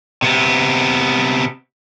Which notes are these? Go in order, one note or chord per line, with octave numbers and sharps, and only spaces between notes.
C3 B3